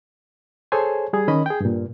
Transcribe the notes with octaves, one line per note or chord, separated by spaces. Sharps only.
G#4 A4 C5 C#5 G#5
G3 G#4
D#3 C#4 D#5 B5
G#4 G5
G2 A#2